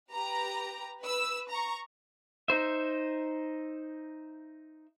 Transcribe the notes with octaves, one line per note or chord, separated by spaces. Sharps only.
G4 B4 A#5
B4 E6
A#5 C#6
D#4 C5 E5